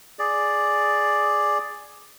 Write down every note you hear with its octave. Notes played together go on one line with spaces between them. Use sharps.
G#4 D5